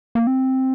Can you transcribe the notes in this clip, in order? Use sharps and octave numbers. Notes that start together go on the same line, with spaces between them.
A#3
C4